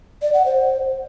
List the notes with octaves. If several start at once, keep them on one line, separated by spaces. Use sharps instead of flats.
D5
F#5
C5